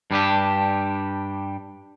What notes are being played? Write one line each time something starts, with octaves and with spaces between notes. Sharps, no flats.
G2 G3 D4 G4